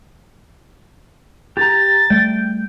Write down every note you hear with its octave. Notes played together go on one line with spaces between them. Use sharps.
G4 A#5 A6
G3 A3 G5